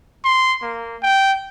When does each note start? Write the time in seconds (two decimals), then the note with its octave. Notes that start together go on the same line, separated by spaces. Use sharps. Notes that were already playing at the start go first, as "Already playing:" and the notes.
0.24 C6
0.62 A#3
1.02 G5